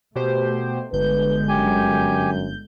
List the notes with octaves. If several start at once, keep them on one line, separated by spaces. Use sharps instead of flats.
B2 A3 G4 C5
G1 D3 G#3 B4 G6
F#2 G4 G#5